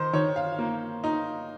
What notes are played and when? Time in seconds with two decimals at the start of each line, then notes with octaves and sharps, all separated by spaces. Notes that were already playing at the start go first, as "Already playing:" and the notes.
Already playing: D#3 C5
0.13 D#3 C#5
0.36 F5
0.59 A#3
1.04 D#4